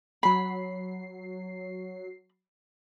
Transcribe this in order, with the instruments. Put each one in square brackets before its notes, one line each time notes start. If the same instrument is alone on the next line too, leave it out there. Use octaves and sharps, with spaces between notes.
[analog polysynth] F#3 C7 [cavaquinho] B5